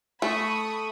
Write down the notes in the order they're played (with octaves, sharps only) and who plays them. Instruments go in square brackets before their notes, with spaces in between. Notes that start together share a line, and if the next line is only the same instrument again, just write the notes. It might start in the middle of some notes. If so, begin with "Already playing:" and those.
[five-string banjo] A3 [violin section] B5 C#6 D#6